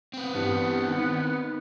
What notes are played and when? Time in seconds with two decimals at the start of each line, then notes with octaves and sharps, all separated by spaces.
0.14 C4 B4
0.34 G2 E3 B3
0.88 D#3